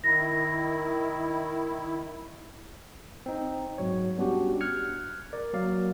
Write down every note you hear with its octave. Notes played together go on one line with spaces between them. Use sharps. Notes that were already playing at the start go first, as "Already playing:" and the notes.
D#3 E4 A#6
C4 D#4
G#2 F#3 C#5
G3 B3 C#4 D4 F#4 G4
F6 F#6 G#6 C#7
A#4 D5
F#3 A#3 D5 F5